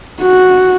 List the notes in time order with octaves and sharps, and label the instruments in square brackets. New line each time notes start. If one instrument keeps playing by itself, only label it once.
[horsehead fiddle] F#4